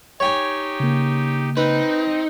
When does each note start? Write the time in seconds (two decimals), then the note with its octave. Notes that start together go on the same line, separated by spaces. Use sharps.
0.20 D#4 G4 C#5 G5 G#5
0.80 C#3 A#3
1.57 C4 D#4 B4